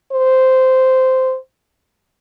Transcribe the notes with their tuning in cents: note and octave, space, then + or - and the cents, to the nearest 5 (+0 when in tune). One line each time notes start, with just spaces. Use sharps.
C5 -10